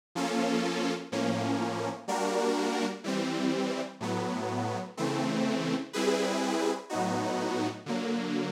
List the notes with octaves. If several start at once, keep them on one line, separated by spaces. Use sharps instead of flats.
F3 A#3 C#4 F4 A4
A2 F3 A#3 C#4
G3 A#3 D4 F#4 A#4
E3 G3 C4
A2 F#3 B3
C#3 E3 A3 C4
G3 C4 E4 G#4 B4
A2 F#3 B3 D#4 F#4
D3 F#3 A#3